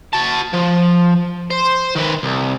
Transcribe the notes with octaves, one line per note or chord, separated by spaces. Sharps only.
F#4 A5
F3
C5
D#3 B4
C2